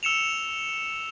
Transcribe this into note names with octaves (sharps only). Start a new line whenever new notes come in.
E6 C#7 E7 F7